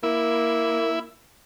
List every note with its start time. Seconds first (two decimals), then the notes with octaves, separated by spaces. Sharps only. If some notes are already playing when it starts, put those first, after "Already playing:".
0.03 A#3 E4